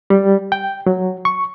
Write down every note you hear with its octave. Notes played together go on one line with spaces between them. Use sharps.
G3
G5
F#3
C#6